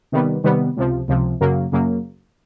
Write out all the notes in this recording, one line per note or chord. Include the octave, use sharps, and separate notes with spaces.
C3 D#3 G3 B3
C3 D#3 G3 B3
C#2 C3 F3
C#2 C3 F3
F#2 C#3 F#3 A#3
F#2 C#3 F#3 A#3